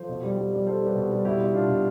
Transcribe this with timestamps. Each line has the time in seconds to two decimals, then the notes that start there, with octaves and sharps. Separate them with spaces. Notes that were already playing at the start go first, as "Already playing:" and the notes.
Already playing: F3 A4 C5
0.09 B2
0.23 G3
0.37 G3
0.52 G3
0.67 G3 A4 C5
0.81 G3
0.86 G4 B4
0.95 B2
1.11 G3
1.25 B2 E4 G4
1.40 B2
1.54 B2 D4 F4
1.68 B2